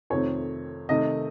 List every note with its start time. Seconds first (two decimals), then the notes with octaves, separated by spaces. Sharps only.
0.10 F2 C3 D#3 A3 C4 C#5
0.89 C3 D#3 A3 D#5